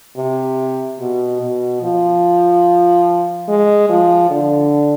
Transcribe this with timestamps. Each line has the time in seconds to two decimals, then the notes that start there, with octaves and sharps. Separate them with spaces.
0.17 C3
0.99 B2
1.41 B2
1.82 F3
3.48 G#3
3.89 F3
4.30 D3